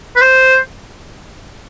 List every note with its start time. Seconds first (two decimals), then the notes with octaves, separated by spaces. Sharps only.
0.16 B4
0.21 C5